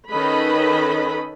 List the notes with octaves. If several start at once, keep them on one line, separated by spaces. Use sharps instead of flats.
D#3 C#4 A4 B4 D#5 B5